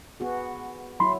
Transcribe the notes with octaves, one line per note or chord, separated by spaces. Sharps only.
B3 F#4 G#4
F#3 E4 B5 C6